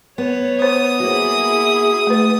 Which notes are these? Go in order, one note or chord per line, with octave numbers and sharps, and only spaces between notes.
B3 C#5
C5 D#6
A#3 E4 F#4 G#4
A3 B4